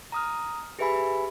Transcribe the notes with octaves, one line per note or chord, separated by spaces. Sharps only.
A#5 D#6 F6
G4 G#4 B4 E5 G#5 B5